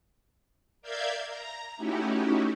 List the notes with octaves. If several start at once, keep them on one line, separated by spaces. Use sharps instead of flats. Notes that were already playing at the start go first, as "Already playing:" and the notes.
A#4 D5 E5 F5 G6 G#6
A#5
A3 C#4 D#4 E4 F#4 G4